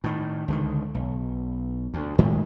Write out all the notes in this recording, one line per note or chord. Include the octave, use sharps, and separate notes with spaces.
A2 D#3
C#2 D3 D#3
B1
D2
A2 D#3 G#3 A3